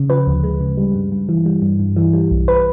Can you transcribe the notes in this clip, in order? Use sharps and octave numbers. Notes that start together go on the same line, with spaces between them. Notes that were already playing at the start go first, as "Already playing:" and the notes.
Already playing: C#3
F3 B4
D2
G#3
C#3
G3
G2
G2
E3
G3
G2
G2
E3
G3
B1
B4